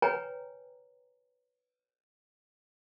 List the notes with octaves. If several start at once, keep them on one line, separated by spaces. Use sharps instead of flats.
B4 C#5 G5 G#5 A#5